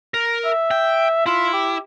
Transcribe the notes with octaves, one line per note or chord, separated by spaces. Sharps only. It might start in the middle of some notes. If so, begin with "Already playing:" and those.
A#4
E5
G5
E4 F4
G4